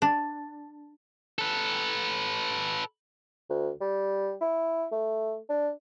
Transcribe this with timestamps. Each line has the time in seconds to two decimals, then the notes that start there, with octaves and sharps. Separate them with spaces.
0.02 D4
1.38 A4 B4
3.50 D2
3.81 G3
4.41 E4
4.92 A3
5.49 D4